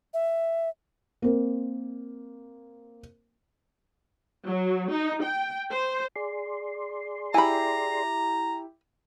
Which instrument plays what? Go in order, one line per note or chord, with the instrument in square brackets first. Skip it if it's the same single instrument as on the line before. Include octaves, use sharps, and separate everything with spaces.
[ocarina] E5
[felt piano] A#3 C4
[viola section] F#3
D#4
G5
C5
[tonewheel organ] G#4 D5 C6
[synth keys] E4 G4 [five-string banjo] G#5 B5 [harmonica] A#5